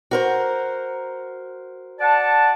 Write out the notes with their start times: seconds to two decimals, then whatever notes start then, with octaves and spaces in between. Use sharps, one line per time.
0.11 F#4 A#4 C5
2.00 D5 F#5 A5